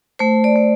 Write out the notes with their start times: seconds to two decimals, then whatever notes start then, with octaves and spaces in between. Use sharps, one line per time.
0.19 A3 C5
0.44 D5
0.56 A3